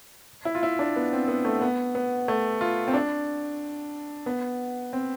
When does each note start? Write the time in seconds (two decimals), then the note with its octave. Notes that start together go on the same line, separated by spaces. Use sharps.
0.45 E4
0.55 F4
0.63 E4
0.79 D4
0.96 B3
1.13 C4
1.28 B3
1.45 A3
1.61 B3
1.95 B3
2.28 A3
2.61 F4
2.88 C4
2.94 D4
4.26 B3
4.93 C4